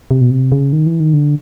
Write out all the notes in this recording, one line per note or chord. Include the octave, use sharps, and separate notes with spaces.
C3
B2
C3
C#3
D#3
E3
D#3
D3